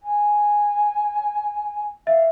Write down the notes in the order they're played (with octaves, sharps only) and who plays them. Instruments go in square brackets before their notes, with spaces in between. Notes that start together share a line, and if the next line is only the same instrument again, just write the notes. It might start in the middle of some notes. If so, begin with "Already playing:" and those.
[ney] G#5
[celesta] E5 [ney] F5